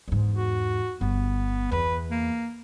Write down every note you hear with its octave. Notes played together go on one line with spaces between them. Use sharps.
E2 G#2
F#4
G1 B3
E2 B4
A#3